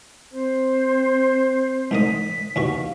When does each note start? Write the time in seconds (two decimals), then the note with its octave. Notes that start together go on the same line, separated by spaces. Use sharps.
0.32 C4 C5
1.91 G#2 A#3 D#5 B6
2.56 D#2 B2 F5 C#6